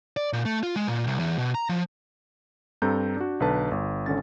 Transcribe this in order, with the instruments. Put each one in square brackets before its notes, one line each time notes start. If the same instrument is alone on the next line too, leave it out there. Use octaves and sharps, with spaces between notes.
[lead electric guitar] D5
A#2
A3
F4
G#3
A#2
C2
E2
B2
A#5
F3
[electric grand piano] G2 C4 A4 A#5 G6
D4 F#4
B1 D3 B4 A5
G1
G#1 D3 C#4 A6